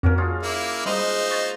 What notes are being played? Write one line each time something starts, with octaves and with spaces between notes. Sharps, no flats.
F2 A#3 C#4 F#4 A#4
D4 F4 G#4
A#3 E4
G3 G#3 D#4 C5 B5 D#7
C#6 G#6 A6